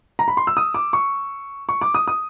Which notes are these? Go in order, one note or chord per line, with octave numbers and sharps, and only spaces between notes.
A#5
B5
C6
E6
D#6
D6
C#6
C#6
D6
D#6
D#6